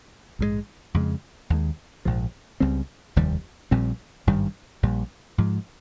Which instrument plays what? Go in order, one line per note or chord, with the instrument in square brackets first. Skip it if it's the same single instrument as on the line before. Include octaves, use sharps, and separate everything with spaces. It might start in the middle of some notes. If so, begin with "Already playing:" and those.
[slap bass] A#1 G#2 F3 G#3
F2 C#3 G#3
D#2 D#3 G#3
A#1 G#2 F3
C#2 C#3 G3 C4
F1 D#2 D#3 G3
A#1 A#2 G3 C4
G#1 G2 D#3 G3
A#1 A#2 G3
G#2 F3 G#3